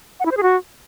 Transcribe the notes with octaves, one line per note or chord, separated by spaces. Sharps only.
F#5
E4
C5
G#4
F#4